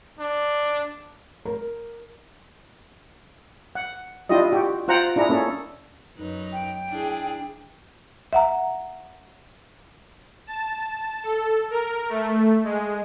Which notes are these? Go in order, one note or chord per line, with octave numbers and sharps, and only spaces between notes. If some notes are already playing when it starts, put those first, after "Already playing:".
D4
A#4
F#5
D4 E4 F4 G4 D#5
F#4 G4
F4 C5 F#5 G5 A#5
D4 E4 G#4 A#5
A#3 C#4 A4
F#2 D#4 B4
G5
D4 E4 G#4
E5 F#5 A#5
A5
A4
A#4
A3
G#3